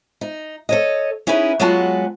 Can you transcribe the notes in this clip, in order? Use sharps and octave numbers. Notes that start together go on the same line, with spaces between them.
D#4
A4 C#5 D#5
C#4 D#4 E4 G#4 B4
F#3 G#3 B3 F4 F#4 A5